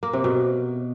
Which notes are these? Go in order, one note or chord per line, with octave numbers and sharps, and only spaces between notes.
A#3
C3
B2